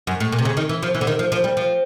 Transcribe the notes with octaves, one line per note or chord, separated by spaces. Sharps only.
F#2
A2
A#2
C3
C#3
D#3
E3
F3
E3
D3
D#3
F3
F3
G3
F3